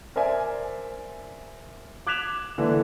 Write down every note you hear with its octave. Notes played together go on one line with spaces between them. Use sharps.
A#4 C5 D5 E5 G#5
D6 F#6 G#6 B6 E7 F7
D3 E3 A#3